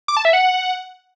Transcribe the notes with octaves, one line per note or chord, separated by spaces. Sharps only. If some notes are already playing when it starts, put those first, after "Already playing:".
D6
A5
E5
F#5